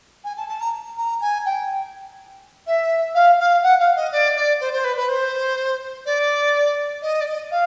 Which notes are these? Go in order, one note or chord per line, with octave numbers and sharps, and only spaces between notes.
G#5
A5
A5
A#5
A#5
G#5
G5
E5
F5
F5
F#5
F5
D#5
D5
D5
C5
C5
B4
B4
C5
D5
D#5
D5
D#5
F5